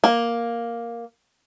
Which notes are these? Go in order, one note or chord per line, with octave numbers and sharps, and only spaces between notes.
A#3